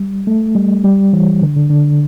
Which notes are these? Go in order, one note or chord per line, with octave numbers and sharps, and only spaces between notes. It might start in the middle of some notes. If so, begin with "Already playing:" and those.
Already playing: G3
A3
G3
G3
E3
D3
D3
D3